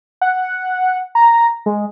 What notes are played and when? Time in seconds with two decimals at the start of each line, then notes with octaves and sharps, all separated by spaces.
0.21 F#5
1.15 A#5
1.66 G#3